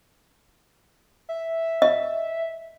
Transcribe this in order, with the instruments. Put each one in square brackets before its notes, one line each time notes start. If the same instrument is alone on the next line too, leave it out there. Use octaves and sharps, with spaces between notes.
[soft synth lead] E5
[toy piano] D#5